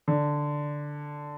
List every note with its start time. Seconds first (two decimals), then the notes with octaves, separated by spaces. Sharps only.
0.08 D3